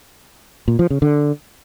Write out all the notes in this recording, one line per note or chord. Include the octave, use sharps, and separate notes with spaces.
A#2
F3
C#3
D3